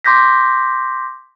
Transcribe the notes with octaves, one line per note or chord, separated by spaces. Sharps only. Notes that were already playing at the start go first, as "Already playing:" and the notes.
C6 D6 G6 A#6 B6